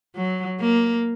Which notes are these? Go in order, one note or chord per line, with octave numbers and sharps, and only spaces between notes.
F#3
A#3